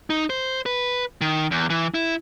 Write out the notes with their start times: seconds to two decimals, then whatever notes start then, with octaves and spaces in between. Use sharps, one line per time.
0.10 D#4
0.30 C5
0.66 B4
1.21 D#3
1.51 E2
1.70 E3
1.94 E4